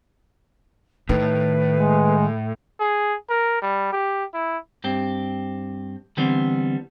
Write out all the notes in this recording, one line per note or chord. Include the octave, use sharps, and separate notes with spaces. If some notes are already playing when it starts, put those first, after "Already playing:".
A2 D#3 B4
G#3
G#4
A#4
G3
G4
E4
G2 C4 G4
D3 E3 G3 B3 C4